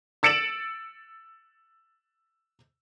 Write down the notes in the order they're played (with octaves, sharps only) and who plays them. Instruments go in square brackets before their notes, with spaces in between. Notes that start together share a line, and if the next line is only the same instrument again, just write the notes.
[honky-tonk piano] E6 A6 C#7 D7 E7 F#7